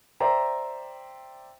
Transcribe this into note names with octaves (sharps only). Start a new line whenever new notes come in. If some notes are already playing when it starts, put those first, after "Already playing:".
C5 D5 E5 G5 A#5